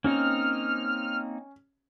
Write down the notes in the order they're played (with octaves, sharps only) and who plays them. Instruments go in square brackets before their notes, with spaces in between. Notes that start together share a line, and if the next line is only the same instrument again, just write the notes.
[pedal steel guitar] A#3 C4 D#4 [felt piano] C#4 [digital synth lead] F6